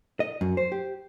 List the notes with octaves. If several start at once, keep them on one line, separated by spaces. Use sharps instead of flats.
D#5
F#2
C5
G4